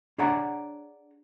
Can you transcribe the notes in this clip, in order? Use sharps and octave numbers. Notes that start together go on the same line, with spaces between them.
D4 G#4 C#5 D5 F#5 A#5